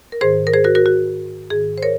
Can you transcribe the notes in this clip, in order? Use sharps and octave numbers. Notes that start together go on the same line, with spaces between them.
A#4
G#2 D#3 G#4 C5
A#4
G#4 C5
F#4 A#4
F#4 A#4
F#4
G#2 D#3 G#4
C5
A#4 C#5